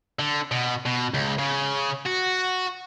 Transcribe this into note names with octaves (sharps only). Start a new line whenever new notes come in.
D3
B2
B2
C#2
C#3
F#4